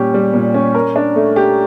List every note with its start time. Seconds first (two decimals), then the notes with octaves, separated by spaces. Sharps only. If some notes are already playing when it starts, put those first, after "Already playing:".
Already playing: A#2 G3 C#4 G4
0.14 G3
0.34 A#2
0.54 C#4
0.74 A#4
0.96 D4
1.16 A3
1.36 G4